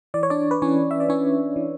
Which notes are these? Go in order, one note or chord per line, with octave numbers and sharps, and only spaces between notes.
E3 D5
C#5
D4 D5
B4
E3 C#4 C#5
E5
D5
E3 C#4 C#5
E3